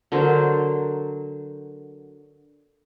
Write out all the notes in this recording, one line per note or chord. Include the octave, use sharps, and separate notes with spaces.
D3 F#3 A#4 C5